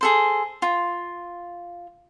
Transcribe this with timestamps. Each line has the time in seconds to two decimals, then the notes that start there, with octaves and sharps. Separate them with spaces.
0.01 G#4 A4 C5
0.62 F4